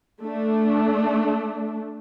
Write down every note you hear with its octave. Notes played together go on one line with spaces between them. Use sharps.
A3 D4